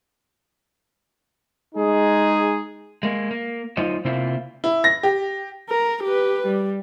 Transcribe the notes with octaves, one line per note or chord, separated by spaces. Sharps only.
G#3 D#4 G#4
G#3 A#3
A#3
F#3 D#4 F4 C5 D#5
C3 A#3 C4 E4 F4
E4
A#6
G4
A#4
G4 B4
G3